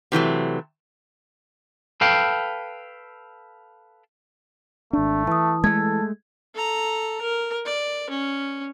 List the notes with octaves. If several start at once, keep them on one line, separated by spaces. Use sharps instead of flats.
C3 E3 F#3 A3
A4 B4 F5 G5
G#1 A3 D4
E3 A5 D#6
G#3 A3 A4 G#6
A4 A#5
A#4
D5
C#4